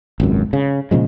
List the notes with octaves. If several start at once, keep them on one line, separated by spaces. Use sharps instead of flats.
G#1 C#2 F#2
C#3
A#2 C#3 F3 G#3